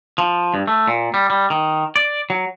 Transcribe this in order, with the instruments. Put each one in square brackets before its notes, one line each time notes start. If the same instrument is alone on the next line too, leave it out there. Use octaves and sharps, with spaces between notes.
[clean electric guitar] F3
G2
A3
A#2
G3
G3
D#3
D5
F#3